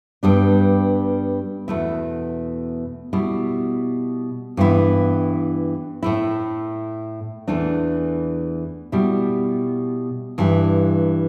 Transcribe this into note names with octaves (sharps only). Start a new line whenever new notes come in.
G2 G3 B3 D4
E2 B2 A3 E4
B2 G3 E4
G2 E3 B3 E4
A2 A3 E4
E2 E3 A3 D4
B2 G3 E4
G2 E3 G3 E4